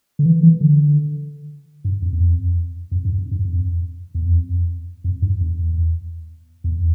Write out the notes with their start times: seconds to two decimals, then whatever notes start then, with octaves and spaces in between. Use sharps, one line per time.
0.19 D3
0.25 E3
0.43 E3
0.61 D3
1.85 G2
2.02 F2
2.13 E2
2.20 F2
2.92 F2
3.05 G2
3.18 F2
3.31 G2
3.45 F2
4.15 E2
4.25 F2
5.04 F2
5.22 G2
5.41 E2
6.64 E2